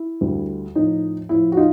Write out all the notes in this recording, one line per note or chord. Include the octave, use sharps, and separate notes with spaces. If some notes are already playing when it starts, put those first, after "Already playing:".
Already playing: E4
D2 D3 G3
A2 F3 D#4
A2 F3 E4
F#4
D#4 F4